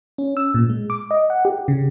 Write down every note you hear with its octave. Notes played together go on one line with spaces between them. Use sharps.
C#4
E6
A#2
G#3
D6
D#5
F#5
G4
C#3